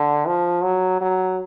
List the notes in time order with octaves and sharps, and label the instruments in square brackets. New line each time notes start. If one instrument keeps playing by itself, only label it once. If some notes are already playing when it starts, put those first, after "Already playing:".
Already playing: [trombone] D3
F3
F#3
F#3